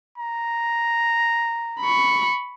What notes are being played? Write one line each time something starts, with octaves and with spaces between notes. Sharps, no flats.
A#5
B5 C#6